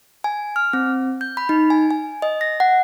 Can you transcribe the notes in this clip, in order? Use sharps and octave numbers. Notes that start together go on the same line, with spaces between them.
G#5
F6
C4
G6
B5
D#4
G#5
G#5
D#5
A#6
F#5